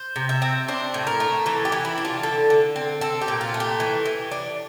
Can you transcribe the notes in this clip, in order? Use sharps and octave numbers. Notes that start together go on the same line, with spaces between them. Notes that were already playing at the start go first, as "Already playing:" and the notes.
Already playing: C5
C3
E5
C4
D4 C5
A2
A#4
A3
E3 A4
G4
E3
E4
D4
F4
D3 A4
D3
C4
C4 A4
G4
A#2
F4
A3
G4
E3
E3
D4